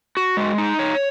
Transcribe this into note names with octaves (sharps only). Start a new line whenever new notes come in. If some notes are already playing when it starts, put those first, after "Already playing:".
F#4
G#3
D#4
C#5